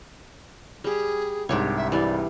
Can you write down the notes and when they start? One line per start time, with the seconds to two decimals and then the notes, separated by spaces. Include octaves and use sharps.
0.84 G3 G4 G#4
1.49 C2 G#2 D4 G4 C#5
1.77 E5
1.92 E3 G3 D5